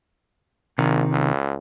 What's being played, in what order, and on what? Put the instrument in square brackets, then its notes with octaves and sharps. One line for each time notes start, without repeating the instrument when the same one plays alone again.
[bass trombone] A#1 [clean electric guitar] C3 D#3
[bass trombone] C#2